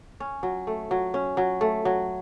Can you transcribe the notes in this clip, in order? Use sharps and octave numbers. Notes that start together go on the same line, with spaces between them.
C#4
F#3
A3
F#3
C#4
F#3
A3
F#3